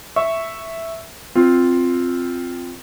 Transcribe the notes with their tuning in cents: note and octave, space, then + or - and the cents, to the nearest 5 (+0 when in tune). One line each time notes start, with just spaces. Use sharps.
E5 +0 C#6 +0
C4 +0 F4 +0